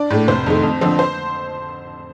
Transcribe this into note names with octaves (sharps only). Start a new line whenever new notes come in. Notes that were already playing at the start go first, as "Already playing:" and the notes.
Already playing: D4 D5
A2 A3
F1 C5
F2 D#3 A3
F2
D3 F3 C4
C5